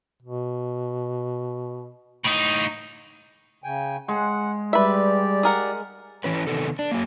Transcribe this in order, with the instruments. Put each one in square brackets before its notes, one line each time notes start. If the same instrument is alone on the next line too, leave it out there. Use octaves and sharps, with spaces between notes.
[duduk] B2
[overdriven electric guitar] A2 D#4
[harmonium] C#3 G5 G#5
[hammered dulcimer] G#3 [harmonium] F#5
[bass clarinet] G3 [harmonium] G4 D5 [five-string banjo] B4 E5
[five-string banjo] G#4 A#4 F#5
[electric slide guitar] E3 C#4 B4
C3 D#3 B3 A4
D4
F#3 A#3